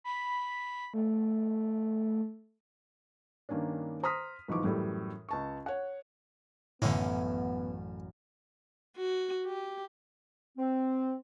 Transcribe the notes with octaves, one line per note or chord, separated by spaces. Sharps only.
B5
A3
G2 D#3 A#3 C#4 D4
C5 A#5 C6 D#6 F6 B6
B1 G#2 E3 F3 C#6 D6
F#2 A2 E3 G3
C#2 A5 C#6
C#5 F#5
A1 F#2 A2 D3 A3 B3 C#4 E4
F#4
G4
C4